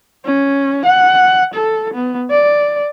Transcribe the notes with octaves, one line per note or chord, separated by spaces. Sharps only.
C#4
F#5
A4
B3
D5